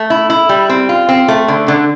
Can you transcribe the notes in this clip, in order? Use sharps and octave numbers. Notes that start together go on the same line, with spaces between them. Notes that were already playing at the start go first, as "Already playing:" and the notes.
Already playing: A3
E4
E4
G3
C4
F4
C4
A3
D3
D3